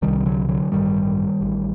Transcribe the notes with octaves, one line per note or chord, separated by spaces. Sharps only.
C2 C3 D#3 G3
D3 F#3
D3 F#3
A1 G2 D3 D#3 G3
A1 A2